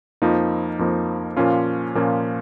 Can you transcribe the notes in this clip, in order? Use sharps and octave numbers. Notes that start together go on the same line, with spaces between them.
F2 F3 A#3 D#4
F2 F3 A#3 D#4
A#2 F3 A#3 C#4 F4
A#2 F3 A#3 C#4 F4